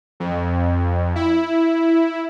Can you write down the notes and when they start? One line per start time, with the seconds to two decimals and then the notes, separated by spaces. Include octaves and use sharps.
0.20 F2
1.15 E4